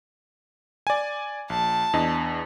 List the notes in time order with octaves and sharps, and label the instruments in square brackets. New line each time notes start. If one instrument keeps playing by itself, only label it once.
[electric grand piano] D5 G#5
[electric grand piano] A#1 [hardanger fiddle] A5
[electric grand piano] E2 D4 D#5